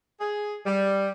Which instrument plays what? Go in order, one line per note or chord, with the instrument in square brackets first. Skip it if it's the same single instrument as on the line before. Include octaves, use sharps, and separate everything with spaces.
[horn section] G#4
G3